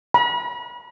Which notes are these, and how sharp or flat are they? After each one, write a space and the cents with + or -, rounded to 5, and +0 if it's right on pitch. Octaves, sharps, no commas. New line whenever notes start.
B5 -40